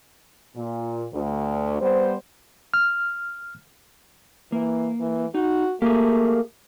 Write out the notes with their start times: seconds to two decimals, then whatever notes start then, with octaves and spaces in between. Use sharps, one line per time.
0.55 A#2
1.12 D2
1.80 G3 B3 C5
2.74 F6
4.52 E3 A#3
5.00 E3
5.35 D#4 F#4
5.82 A3 A#3 G4 G#4